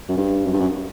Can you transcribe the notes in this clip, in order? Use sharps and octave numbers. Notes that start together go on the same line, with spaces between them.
F#2
G2
F#2
G2
F#2